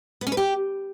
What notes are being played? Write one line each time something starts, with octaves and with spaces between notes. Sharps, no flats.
B3
C#4
B4
G4